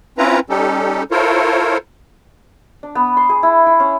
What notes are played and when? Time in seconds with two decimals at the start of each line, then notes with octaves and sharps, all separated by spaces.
0.18 C4 C#4 E4 F4 B4 A#5
0.50 G3 C#4 D#4 G4 A4
1.11 E4 F4 A4 A#4 C5 C#5
2.83 D4
2.95 B3
3.17 C6
3.29 G#4
3.43 E4
3.67 E4
3.80 C#4